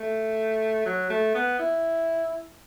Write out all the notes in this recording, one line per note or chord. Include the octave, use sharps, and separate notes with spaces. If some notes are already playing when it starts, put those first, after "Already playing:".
Already playing: A3
F#3
A3
B3
E4